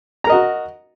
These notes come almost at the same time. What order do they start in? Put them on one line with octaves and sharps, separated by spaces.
A#5 A#4 D#5 F#4